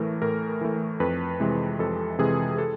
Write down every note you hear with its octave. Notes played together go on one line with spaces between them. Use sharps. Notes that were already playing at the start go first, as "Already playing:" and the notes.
Already playing: A2 E3 A3 A#4
A2 A#4
E3 A3
F2 B4
C3 E3 G#3
F2 A4
C3 E3 G#3 G#4
A4